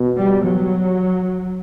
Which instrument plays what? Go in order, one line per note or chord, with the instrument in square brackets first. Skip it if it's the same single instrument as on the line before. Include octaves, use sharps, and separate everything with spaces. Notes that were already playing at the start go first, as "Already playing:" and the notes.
Already playing: [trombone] B2
[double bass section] G3
F#3